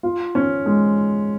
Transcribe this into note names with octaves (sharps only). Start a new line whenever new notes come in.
F4
C#4
G#3